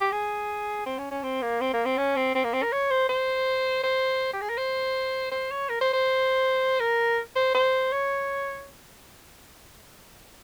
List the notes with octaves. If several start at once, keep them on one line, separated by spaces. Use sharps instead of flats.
G4
G#4
C4
C#4
C#4
C4
A#3
C4
A#3
C4
C#4
C4
C4
A#3
C4
A#4
C#5
C5
C5
C5
G4
G#4
A#4
C5
C5
C#5
A#4
C5
C5
A#4
C5
C5
C#5